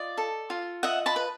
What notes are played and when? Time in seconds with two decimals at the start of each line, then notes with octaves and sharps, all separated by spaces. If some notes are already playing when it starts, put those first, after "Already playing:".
Already playing: F4 D5 D#5
0.18 A4
0.50 F4
0.83 D#5 E5 F#5
1.06 A5 B5
1.16 B4